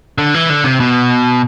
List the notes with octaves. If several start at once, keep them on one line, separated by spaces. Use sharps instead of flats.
D3
E3
D3
C3
B2